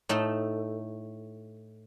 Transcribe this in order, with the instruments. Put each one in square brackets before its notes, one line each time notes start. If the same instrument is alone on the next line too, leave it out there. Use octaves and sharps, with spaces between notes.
[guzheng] A2 A3 D#4 A4